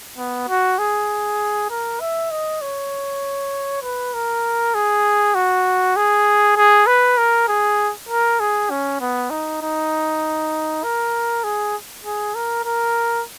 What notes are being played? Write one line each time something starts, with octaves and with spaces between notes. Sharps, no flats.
B3
F#4
G#4
A#4
E5
D#5
C#5
B4
A#4
G#4
F#4
G#4
G#4
B4
A#4
G#4
A#4
G#4
C#4
B3
D#4
D#4
A#4
G#4
G#4
A#4
A#4